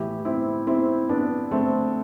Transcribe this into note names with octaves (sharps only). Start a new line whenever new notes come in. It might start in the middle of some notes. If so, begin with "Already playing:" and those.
Already playing: A2 E3 E4 G4
C4 E4
C4 E4
B3 D4
A3 C4